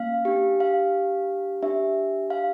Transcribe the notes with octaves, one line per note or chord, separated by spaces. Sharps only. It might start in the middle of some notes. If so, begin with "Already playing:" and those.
Already playing: A#3 C#4 F5
D4 G4
F5
D4 G4 E5
F5